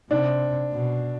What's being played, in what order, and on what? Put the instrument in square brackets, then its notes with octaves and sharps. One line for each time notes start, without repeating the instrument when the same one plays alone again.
[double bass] C3 [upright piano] D4
[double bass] B2